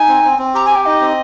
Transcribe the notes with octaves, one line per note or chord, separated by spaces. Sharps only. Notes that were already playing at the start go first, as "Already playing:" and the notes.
Already playing: D#4 G#5
C4
C4
C4
G4 A#5
G#5
G4
G5
D#4 D#5
C4